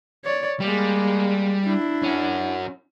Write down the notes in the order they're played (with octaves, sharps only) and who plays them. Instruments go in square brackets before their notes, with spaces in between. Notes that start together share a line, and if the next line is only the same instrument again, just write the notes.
[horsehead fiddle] C#5 D5
[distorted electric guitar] G3 [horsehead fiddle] G#3 A#3
[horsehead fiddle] D4 E4
[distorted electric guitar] C#4 F#4